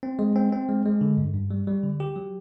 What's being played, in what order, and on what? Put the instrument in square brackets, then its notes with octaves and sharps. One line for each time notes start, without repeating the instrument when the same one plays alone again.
[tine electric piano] C4
G#3
C4
C4
G#3
G#3
D3
G2
G2
G3
G3
D3
G4
F#3